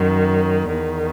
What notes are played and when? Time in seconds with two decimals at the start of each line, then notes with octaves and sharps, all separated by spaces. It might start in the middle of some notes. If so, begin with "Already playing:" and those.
Already playing: F#2 D#3
0.73 E2 D#3